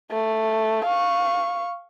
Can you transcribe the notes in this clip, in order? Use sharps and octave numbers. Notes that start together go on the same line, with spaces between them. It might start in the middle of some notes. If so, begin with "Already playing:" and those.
A3
F5 C#6